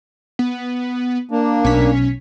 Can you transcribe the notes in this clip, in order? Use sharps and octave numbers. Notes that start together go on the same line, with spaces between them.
B3
A#3 D4
B1 C#4 B6